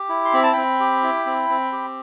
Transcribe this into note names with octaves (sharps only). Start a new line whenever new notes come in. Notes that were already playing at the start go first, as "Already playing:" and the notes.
Already playing: G4
E4
C6
C4 B5
A5
C4 G5 B5
G4
E4
C4
C4
G4